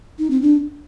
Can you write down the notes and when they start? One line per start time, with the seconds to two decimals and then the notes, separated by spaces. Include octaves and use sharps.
0.19 D#4
0.30 C4
0.42 D4